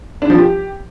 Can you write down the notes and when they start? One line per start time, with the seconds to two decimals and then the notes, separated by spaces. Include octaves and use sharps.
0.22 D4
0.30 F3
0.38 G4